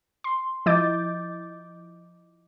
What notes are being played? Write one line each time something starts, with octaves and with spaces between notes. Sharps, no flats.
C6
F3 E4 D#5 D6 G6 A6